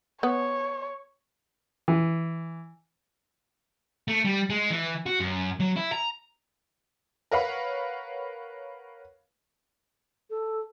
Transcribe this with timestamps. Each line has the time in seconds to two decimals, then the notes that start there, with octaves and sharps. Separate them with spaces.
0.23 B3 C#5
1.88 E3
4.08 A3
4.25 G3
4.50 G#3
4.70 E3
5.06 F#4
5.20 F#2
5.60 F#3
5.76 E4
5.92 A#5
7.31 A#4 B4 C#5 F5 F#5 B5
10.29 A4